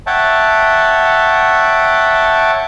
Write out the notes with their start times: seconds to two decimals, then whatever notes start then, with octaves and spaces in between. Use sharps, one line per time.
0.07 C#5 E5 F#5 G5 A5